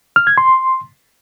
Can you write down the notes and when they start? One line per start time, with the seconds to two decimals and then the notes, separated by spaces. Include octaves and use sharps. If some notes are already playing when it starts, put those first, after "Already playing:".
0.16 F6
0.27 G#6
0.38 C6